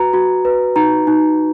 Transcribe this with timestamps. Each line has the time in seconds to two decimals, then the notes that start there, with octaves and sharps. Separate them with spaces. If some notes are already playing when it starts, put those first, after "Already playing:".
Already playing: F#4 B4 A#5
0.13 F#4
0.45 B4
0.76 D#4 A#5
1.07 D#4